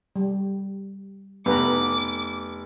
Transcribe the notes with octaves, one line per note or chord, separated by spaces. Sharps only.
G3
F1 B3 B4 A#5 D6